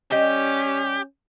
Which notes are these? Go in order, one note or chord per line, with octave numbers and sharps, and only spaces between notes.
G3 C#4 G4 D#5